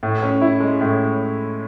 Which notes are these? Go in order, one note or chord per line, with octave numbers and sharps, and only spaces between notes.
A2
C#4
E4
G#3
A2